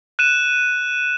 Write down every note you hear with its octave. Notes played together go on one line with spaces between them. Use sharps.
F#6 D#7 E7